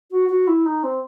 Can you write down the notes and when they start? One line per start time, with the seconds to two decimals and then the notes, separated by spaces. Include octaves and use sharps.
0.11 F#4
0.29 F#4
0.47 E4
0.66 D#4
0.83 C4